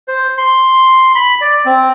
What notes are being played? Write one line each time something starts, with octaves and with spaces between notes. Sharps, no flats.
C5
C6
B5
D5
C4